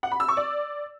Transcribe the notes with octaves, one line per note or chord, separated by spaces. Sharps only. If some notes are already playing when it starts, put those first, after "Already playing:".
F#5
B5
E6
C#6
D5